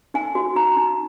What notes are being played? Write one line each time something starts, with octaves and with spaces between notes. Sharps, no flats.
D#4 G#5
F#4
D#4 A#5
D#4